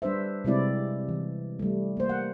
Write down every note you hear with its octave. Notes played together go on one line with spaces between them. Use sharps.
G3 D4 B4 C5 E5
C3 G3 G#3 C4 E4 D5
E3
G3 A3
A#3 C5
F#5